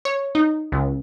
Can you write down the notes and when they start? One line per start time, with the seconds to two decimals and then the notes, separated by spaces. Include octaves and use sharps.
0.05 C#5
0.35 D#4
0.72 C#2